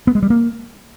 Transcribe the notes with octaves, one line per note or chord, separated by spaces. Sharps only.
B3
G#3
G3
A#3